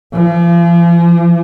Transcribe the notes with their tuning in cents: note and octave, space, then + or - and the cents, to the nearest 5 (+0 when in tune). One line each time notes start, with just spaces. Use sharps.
F3 -40